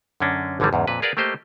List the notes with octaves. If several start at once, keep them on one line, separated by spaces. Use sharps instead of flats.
F#2 D3 C#4 D4
G#1 D3 E3 F#3 G3
E2 G#2 C#3
F2 A#2 B4
G#4 A#4 B4 D5 F5 F#5
A3 A#3 G4 C5 D#5